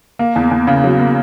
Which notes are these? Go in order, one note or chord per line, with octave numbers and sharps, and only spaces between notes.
A#3
E2
E2
C#3
F#3
A#3